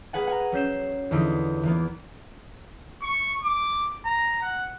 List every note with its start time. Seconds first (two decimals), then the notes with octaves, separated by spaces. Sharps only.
0.13 A#3 G#4 B4 F#5 G#5
0.27 F#5 G#5 A#5
0.52 F#3 C#4 G6 C7 E7
1.11 E2 D3 F3 D#4 E4
1.63 E3 A#3 B3
3.02 C#6
3.43 D6
4.05 A#5
4.42 F#5